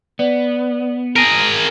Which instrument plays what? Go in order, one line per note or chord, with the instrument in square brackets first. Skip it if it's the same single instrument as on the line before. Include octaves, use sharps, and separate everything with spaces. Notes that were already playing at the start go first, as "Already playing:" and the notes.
[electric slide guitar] B3 [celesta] D5
[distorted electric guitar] G#4 A#4 [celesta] A#6 D7 D#7